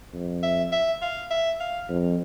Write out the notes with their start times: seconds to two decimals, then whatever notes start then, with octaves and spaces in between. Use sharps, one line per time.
0.14 F2
0.43 E5
0.72 E5
1.02 F5
1.30 E5
1.60 F5
1.89 F2